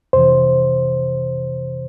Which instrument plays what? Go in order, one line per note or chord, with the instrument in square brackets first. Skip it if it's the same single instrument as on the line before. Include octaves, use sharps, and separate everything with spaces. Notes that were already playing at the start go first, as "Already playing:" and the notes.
[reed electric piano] F2 C3 E3 C5